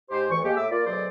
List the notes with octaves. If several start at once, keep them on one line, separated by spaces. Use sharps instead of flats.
G#2 G4 C5
D2 E3 C#6
G#3 A#3 G4
A2 E5 D6 E6
A#3 F4 D5
D2 B2 F#3 G#4 C5 D5